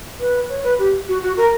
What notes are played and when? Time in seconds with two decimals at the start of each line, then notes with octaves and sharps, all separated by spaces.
0.20 B4
0.49 C#5
0.64 B4
0.79 G4
1.08 F#4
1.22 F#4
1.37 A#4